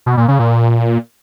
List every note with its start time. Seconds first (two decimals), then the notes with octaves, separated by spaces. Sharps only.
0.06 B2
0.17 A#2
0.28 C#3
0.39 A#2